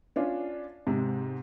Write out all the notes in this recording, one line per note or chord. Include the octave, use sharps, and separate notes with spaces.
C#4 D4 F4
G#2 C3